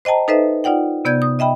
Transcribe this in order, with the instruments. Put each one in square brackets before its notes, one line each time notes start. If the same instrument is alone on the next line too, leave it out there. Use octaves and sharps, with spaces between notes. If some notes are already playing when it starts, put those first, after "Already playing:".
[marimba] C5 D#5 G5 A5 A#5
D#4 A4 B4 C5 D#5 E5
D#4 F4 D5 F#5 G5
C3 B3 D5 G6 G#6
D#6
D#5 E5 G5 B5